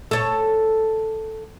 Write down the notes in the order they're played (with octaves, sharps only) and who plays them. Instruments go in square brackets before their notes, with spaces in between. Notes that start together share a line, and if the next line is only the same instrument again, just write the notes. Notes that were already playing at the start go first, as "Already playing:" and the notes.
[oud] A4 C#5